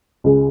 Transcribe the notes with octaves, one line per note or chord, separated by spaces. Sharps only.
C#2 C#3 G#3